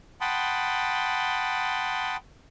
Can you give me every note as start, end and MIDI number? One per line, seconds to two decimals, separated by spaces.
0.21 2.16 78
0.21 2.16 79
0.21 2.16 81
0.21 2.16 83
0.21 2.16 84
0.21 2.16 87